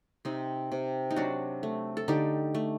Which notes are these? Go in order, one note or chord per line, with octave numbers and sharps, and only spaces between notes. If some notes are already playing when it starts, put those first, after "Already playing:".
C3 C4 D#4
C3
D#4
F#3 D4 F#4
A3
A4
D3 D#4 G4
A3